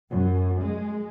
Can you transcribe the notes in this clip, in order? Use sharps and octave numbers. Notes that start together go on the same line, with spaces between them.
F#2
G#3